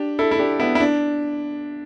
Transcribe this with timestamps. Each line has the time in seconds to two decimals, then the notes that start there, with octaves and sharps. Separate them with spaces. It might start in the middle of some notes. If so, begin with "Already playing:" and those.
Already playing: D4 G4
0.19 E4 A4
0.31 E4
0.39 D4 G4
0.60 B3 E4
0.75 E4
0.80 D4